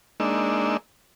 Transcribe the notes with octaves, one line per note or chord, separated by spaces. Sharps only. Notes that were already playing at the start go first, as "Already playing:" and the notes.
G#3 A#3 D4 D#4 E6